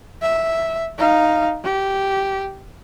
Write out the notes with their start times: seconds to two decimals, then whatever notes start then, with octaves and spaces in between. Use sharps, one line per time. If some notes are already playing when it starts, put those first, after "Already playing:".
0.22 E5
0.98 D#4 F5
1.64 G4